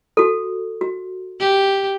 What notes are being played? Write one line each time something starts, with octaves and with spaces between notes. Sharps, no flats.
F#4 A4
F#4
G4